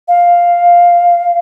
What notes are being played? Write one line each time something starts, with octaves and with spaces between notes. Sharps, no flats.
F5